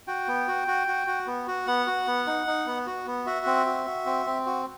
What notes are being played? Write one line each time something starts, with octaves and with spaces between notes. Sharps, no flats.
F#4 G5
B3
F#4
F#4
F#4
F#4
B3
F#4
B3 F#5
F#4
B3
D#4
D#4
B3
F#4
B3
F#4 E5
C4
F#4
F#4
C4
C4
F#4